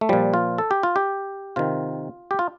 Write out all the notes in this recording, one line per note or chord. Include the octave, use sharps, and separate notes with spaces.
A3
A#2 F3 G3
F4
A4
G4
F4
G4
C3 D#3 F4
G4
F4